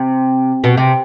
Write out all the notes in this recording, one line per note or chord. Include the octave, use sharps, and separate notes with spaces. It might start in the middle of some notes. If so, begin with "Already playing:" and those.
Already playing: C3
B2
C3